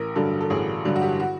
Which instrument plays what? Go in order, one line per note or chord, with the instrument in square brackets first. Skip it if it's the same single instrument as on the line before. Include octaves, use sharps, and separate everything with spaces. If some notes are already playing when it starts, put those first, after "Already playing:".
Already playing: [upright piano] A1 A#4
G2 D3 F#3 A4
A4
A1 G#4
G2 D3 F#3
F#4
G4
F#4